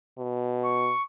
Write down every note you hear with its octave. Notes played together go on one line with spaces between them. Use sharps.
B2
C#6